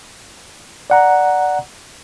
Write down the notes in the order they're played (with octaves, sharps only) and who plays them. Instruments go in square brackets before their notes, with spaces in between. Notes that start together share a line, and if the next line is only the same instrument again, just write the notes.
[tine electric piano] D5 F#5 A#5